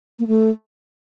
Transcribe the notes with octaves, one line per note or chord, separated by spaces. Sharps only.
A#3
A3